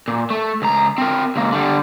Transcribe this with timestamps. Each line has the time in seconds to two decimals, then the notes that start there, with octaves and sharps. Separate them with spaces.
0.08 A#2
0.30 A3
0.62 C#2 A#5
0.98 C4 A#4
1.36 C#2 A#3
1.53 D3 G3